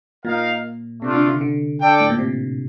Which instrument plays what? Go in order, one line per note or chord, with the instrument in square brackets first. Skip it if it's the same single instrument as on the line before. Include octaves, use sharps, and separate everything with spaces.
[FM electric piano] A#2 [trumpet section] D#4 A#4 F5
[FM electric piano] C3 [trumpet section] A3 D4 F4
[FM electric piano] D3
D3
D3
[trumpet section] D4 A4 D5 G5
[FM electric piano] A2
A#2
C3